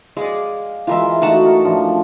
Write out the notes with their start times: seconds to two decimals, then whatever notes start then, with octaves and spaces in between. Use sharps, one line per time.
0.17 G#3 D5 F5
0.87 E3 G#3 F4 A#4 E5
1.22 A3 D#4 F#4 F#5 A5
1.46 A#4
1.64 A2 F3 D4